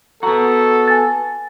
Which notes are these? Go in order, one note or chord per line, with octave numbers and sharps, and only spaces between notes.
B3 F#4 A4 A#5
G#5 A6